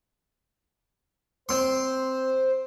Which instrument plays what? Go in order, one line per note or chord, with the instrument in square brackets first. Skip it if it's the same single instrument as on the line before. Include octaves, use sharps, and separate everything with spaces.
[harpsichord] C4 C6 [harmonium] C5